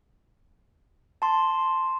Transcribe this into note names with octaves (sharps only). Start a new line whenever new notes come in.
A5 C6